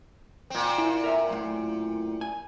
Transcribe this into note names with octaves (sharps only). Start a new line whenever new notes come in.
A#2 C4
E4
A#4 E5 A#5
F#2 A2
G#5